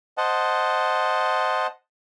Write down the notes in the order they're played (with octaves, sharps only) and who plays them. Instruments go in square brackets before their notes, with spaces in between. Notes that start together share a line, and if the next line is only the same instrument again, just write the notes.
[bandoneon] C5 D#5 F#5 A5